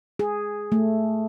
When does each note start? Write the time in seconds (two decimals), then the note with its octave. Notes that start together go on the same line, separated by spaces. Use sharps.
0.19 G#4
0.72 A3